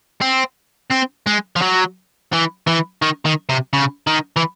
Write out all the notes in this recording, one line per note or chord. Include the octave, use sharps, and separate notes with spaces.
C4
C4
G#3
F3
F#3
E3
E3
D#3
D#3
C3
C#3
D#3
E3